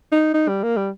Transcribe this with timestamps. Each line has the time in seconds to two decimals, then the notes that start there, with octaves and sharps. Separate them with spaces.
0.12 D#4
0.34 D#4
0.48 G3
0.63 A#3
0.77 G3